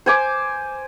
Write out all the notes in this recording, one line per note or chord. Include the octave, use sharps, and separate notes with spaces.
C5 G#5 D6